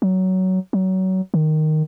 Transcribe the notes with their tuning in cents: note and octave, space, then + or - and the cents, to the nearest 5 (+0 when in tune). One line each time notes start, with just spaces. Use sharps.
F#3 +15
F#3 +25
D#3 -5